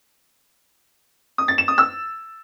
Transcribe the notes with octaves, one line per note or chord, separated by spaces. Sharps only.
D#6
A6
E7
D#6
E6